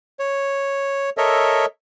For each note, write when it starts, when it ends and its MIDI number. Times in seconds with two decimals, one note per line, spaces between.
0.19 1.10 73
1.17 1.66 69
1.17 1.66 70
1.17 1.66 73
1.17 1.66 75
1.17 1.66 76